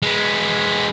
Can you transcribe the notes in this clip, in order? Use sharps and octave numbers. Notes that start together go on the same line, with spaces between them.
G#3 B3